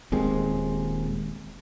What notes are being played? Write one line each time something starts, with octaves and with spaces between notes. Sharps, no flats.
D#1 D#2 G#3 C4